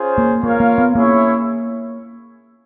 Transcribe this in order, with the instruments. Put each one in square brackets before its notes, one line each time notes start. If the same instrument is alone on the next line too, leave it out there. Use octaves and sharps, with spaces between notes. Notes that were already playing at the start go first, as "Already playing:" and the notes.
Already playing: [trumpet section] C#4 F4 G#4 C5
[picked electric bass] A#3
[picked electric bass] A#3 [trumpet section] F4 A#4 C#5 F5
[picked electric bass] A#3
B3
[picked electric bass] A#3 [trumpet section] C#4 E4 G#4 C#5 E5